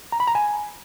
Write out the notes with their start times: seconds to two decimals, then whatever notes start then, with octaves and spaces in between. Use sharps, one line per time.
0.12 A#5
0.20 B5
0.28 A#5
0.35 G#5